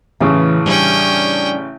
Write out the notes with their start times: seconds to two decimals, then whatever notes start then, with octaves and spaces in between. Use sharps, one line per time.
0.20 A1 C#3 E3
0.66 G3 C#4 D4 G5